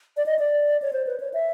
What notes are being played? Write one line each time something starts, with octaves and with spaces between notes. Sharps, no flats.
D5
D#5
D5
C#5
C5
B4
C#5
E5